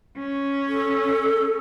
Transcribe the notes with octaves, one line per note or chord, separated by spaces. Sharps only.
C#4
A4